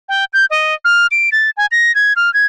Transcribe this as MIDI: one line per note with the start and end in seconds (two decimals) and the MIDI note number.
0.09 0.25 79
0.33 0.45 91
0.50 0.74 75
0.85 1.07 89
1.11 1.30 98
1.32 1.50 93
1.57 1.66 80
1.72 1.94 94
1.95 2.13 92
2.16 2.32 89
2.34 2.46 92